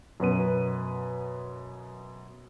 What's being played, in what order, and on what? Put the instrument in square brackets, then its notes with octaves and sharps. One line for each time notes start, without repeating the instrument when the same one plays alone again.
[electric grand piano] F#2 B2 B4 D#7